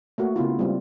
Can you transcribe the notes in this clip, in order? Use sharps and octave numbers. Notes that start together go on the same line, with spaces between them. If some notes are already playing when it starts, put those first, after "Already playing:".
A3 A#3 F#4
C#3 B3 E4 F4
G3 G#3 C4 F4